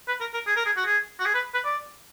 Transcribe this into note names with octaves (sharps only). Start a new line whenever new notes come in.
B4
A#4
A#4
G#4
A#4
G#4
F#4
G#4
F#4
G#4
B4
B4
D5